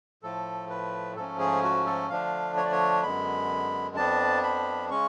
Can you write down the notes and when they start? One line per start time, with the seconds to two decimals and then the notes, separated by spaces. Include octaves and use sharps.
0.23 A2 F3 A3 A4
0.70 B4
1.16 G#2 F3 A3 C#4 A4
1.39 G#4
1.63 F#4
1.86 A4
2.10 D3 F3 A3 D4 F5
2.57 C#5
2.64 D5
2.72 C#5
3.03 F#2 D3 G#3 B3 B5
3.96 F2 F3 B3 D4 A5
4.43 B5
4.90 C#3 G#3 C#4 C#6